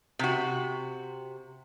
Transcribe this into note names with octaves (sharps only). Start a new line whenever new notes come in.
C3 F#4